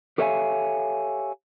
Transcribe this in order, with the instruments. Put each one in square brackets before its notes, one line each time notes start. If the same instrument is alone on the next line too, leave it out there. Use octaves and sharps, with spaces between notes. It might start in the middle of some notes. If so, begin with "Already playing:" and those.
[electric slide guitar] G4 A4 C#5 E5 F5 G#5